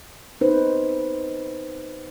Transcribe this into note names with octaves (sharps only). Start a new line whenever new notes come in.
D#4 B4 C5